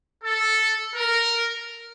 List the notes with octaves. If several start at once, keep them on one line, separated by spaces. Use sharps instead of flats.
A4
A#4